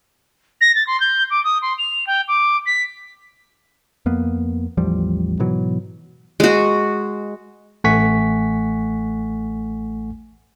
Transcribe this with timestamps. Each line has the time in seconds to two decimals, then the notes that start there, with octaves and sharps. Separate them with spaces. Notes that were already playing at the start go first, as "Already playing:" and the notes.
0.61 A#6
0.75 A6
0.86 C6
1.00 G6
1.30 D6
1.44 D#6
1.61 C6
1.78 F7
2.06 G5
2.27 D6
2.65 B6
4.06 F2 A#3 B3
4.77 A1 E2 F3 G3
5.39 G#2 B2 E3 F#3
6.40 G#3 F#4
7.84 A1 A3 F#5 G#5 C#6 B6